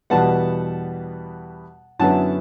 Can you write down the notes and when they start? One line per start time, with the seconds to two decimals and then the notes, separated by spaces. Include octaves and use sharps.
0.10 E2 B2 G3 B3 F#5 A5
1.99 F#2 D3 F#3 B3 E4 F#5 A5